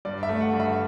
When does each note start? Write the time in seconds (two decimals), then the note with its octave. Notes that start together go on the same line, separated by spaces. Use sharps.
0.05 G2 D5
0.23 E5
0.29 A3
0.41 F#5
0.53 G2
0.60 E5